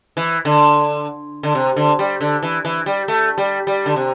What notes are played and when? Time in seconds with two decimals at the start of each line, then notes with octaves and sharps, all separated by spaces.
0.17 E3
0.45 D3
1.43 D3
1.55 C3
1.76 D3
1.99 G3
2.21 D3
2.43 E3
2.65 E3
2.86 G3
3.08 A3
3.38 G3
3.67 G3
3.86 D3
3.96 C3